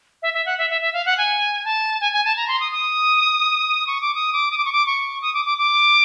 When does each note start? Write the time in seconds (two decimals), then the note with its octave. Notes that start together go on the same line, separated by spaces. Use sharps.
0.22 E5
0.34 E5
0.46 F#5
0.58 E5
0.70 E5
0.82 E5
0.93 F5
1.06 F#5
1.18 G#5
1.65 A5
2.01 G#5
2.13 G#5
2.25 A5
2.37 A#5
2.48 C6
2.60 D#6
2.72 D#6
3.87 C#6
4.01 D6
4.15 D#6
4.33 D6
4.51 D#6
4.58 D6
4.65 C#6
4.72 D6
4.87 C#6
5.22 D#6
5.34 D6
5.45 D6
5.58 D6